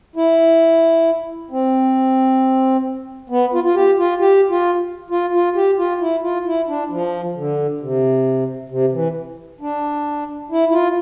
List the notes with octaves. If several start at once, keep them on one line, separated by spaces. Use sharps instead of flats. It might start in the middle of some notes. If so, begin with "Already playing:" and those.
E4
C4
B3
F4
F4
G4
F4
G4
F4
F4
F4
G4
F4
E4
F4
E4
D4
F3
D3
C3
C3
E3
D4
E4
E4
F4